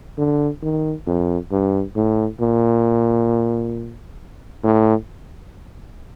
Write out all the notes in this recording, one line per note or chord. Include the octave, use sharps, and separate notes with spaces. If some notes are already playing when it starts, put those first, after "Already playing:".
D3
D#3
F2
G2
A2
A#2
A2